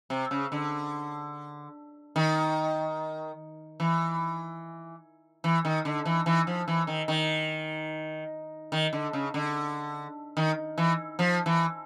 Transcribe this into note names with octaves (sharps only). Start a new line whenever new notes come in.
C3
C#3
D3
D#3
E3
E3
D#3
D3
E3
E3
F3
E3
D#3
D#3
D#3
D3
C#3
D3
D#3
E3
F3
E3